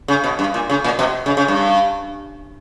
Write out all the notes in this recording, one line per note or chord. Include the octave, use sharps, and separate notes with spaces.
C#3
B2
G2
A#2
C#3
A#2
B2
C#3
C#3
G2